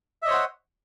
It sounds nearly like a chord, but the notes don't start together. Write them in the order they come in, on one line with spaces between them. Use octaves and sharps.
E5 D#5 C#5 C5 F#5